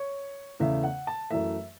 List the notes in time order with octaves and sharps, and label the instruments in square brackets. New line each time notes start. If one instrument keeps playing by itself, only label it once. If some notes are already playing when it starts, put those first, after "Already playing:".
Already playing: [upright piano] C#5
E2 C#3 A3 E5
F#5
A5
F#2 E3 A3 E5